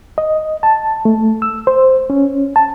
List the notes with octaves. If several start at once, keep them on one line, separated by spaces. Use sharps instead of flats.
D#5
A5
A3
E6
C5
C#4
A5